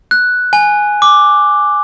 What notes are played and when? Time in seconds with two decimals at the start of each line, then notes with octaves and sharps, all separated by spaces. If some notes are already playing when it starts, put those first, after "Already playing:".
0.11 F#6
0.53 G#5
1.02 D6